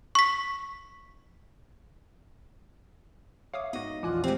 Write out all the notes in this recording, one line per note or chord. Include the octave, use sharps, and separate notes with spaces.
C#6 B6
C#5 E5 F5 D6 D#6
G#2 B3 F#4 D#5
A#1 E2 F4 F#5 G#5 D6 F#6
G#3 C4 G4 G#5